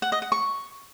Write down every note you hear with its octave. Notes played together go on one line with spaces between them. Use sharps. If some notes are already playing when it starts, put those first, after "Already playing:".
F#5
D#5
F#5
C#6